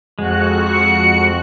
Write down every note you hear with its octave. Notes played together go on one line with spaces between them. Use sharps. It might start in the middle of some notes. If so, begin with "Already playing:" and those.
F2 G#3 F#4 F#6
C#7